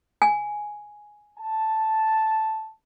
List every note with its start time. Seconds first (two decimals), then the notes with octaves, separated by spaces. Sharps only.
0.22 G#5
1.39 A5